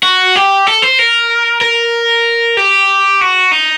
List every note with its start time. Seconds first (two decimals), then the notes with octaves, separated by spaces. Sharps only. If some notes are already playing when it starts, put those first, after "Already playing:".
0.03 F#4
0.35 G4
0.67 A4
0.82 C5
0.99 A#4
1.61 A#4
2.57 G4
3.21 F#4
3.52 D#4